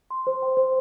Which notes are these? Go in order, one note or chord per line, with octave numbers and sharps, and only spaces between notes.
C6
C5
G5
C5